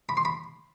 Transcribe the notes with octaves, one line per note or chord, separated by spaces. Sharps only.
B5
C6
B5